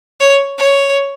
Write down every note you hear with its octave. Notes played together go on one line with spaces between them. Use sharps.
C#5
C#5